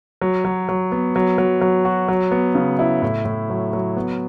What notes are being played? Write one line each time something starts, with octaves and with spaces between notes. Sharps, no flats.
F#3
F#3
F#3
B3
F#3
F#3
F#3
F#4
F#3
B3
C#3
E4
A2
A2
F#3
F#3
B3